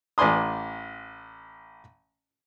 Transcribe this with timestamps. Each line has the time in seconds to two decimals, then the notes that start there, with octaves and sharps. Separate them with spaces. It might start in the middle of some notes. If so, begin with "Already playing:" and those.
0.18 A1 D5 G#5 C6 D#6